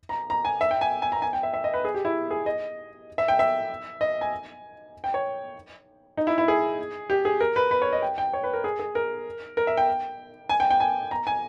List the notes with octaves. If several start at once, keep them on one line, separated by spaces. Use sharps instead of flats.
A#5
A#5
G#5
E5
G5
G#5
G#5
A#5
G#5
G5
E5
E5
D#5
B4
G#4
G4
E4
G#4
D#5
E5
G5
E5
D#5
G#5
G5
C#5
D#4
E4
E4
G#4
G4
G#4
A#4
B4
B4
C#5
D#5
G5
G5
C#5
B4
A#4
G#4
G#4
A#4
A#4
E5
G5
G#5
G5
G5
G#5
A#5
G#5